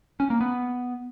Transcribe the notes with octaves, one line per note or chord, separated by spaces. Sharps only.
C#4
A#3
B3